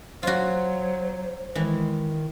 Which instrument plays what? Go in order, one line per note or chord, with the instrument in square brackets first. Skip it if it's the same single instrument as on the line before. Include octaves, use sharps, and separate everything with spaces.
[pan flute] F#3 [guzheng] F4 F#4 [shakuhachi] C5
[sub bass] D#3 [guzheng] E3 [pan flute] G#3